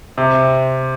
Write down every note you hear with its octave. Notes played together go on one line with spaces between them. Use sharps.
C3